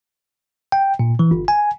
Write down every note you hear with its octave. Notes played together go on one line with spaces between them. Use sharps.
G5
A#2
E3
G1
G#5